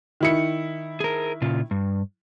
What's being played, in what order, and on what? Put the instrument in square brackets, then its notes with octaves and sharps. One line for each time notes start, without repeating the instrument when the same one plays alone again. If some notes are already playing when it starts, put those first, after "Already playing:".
[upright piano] D#3 E4 C#7
[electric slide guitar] G#4 A#4
A#2 C#3 F4
G2